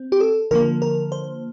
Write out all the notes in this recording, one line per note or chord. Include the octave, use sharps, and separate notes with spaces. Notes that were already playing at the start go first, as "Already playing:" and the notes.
Already playing: C4
G4
A4
D3 F3 A#3 A#4
A#4
C5